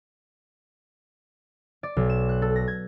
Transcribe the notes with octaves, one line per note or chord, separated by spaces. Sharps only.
D5
B1
E7
F#6
A4
A#6
G#6